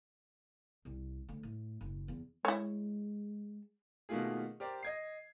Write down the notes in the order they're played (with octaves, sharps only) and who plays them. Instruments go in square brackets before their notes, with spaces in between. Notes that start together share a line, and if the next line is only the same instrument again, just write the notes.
[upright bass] C2
D2
A2
F#1
E2
[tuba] G#3 [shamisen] E4 C#5
[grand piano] B2 D#3 A3 A#3 F4 G#4
G4 A#4 C5 D5
D#5 G#6 C7